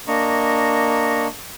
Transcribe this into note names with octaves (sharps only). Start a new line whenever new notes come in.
A#3 D4 D#5 A#5 C#6